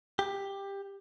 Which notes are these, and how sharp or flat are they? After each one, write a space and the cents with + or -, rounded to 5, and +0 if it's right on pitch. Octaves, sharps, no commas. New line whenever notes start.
G4 +15